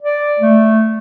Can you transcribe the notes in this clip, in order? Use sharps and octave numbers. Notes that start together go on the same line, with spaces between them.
D5
A3